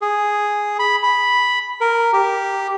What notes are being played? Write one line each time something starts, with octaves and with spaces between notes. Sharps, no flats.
G#4
B5
B5
A#4
G4